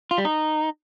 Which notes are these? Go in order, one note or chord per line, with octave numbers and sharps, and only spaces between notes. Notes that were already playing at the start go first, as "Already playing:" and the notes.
F4
G3
D#4